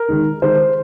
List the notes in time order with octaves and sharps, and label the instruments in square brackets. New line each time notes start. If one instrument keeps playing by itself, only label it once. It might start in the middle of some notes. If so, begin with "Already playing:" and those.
Already playing: [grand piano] A#4
D#3 G#3 D#4
D#3 G#3 D#4 C5